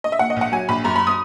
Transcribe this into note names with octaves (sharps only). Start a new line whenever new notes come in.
D#5
E5
A#2 F#5
D#5
A#1 F#5
F#3 G#5
A#1 B5
F#2 A#5
B5
D#6